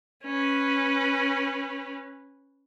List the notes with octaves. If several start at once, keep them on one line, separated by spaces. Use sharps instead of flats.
C#4 B4